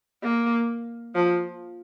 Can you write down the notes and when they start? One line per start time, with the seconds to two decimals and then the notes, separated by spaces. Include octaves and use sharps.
0.23 A#3
1.15 F3